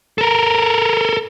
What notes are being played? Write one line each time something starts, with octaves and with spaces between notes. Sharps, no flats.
A4 A#4